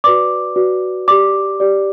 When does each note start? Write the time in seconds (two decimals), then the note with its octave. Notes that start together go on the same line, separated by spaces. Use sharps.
0.04 F#4 B4 D5 D6
0.56 F#4 B4 D5
1.08 G4 D5 D6
1.60 G4 D5